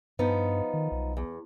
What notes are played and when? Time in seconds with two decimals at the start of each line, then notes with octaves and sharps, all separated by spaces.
0.19 G2 F3 B3 D#4
0.74 D#3
0.92 B1
1.17 E2